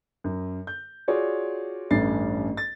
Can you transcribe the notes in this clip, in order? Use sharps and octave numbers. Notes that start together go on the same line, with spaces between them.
F#2
G6
F4 F#4 G#4 C#5 D5
A1 G2 A3 C#4 A6 C7
A6